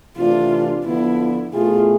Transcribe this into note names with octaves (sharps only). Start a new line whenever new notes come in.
C3 E3 A3 D4 F4
D3 F3 B3 E4
B2 A3 E4 F4 G#4